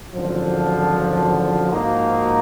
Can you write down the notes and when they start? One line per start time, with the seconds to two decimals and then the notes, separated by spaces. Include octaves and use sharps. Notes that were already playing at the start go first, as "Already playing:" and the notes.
0.13 G#1 F#2 D3 F3
1.69 G#2 F3 A#3 D#4 F#4